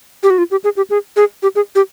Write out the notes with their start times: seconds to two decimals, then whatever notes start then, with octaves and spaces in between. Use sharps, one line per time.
0.23 G4
0.30 F#4
0.38 F4
0.51 G4
0.64 G#4
0.77 G4
0.90 G#4
1.16 G#4
1.43 G4
1.55 G#4
1.75 G4